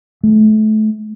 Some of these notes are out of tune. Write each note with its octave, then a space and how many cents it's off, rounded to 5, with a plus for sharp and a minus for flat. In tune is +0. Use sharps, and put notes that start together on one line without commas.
A3 -30